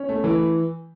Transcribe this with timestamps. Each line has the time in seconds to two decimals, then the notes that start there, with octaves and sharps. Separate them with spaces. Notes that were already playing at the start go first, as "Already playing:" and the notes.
Already playing: C#4
0.09 A3
0.24 E3